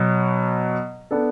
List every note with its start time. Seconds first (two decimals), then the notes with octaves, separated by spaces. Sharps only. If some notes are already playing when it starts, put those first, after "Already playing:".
Already playing: B2 F#3
1.11 B3 D4 A4